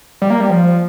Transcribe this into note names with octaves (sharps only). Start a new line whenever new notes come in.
G3
A#3
G3
F3